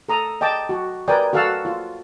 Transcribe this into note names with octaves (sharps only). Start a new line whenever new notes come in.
A4 A#5 D#6
D#5 G5 A5 D6
F#4
A#4 B4 D5 G5 G#5 D#6
F#4 A4 F5 F#5 A5 E6
F4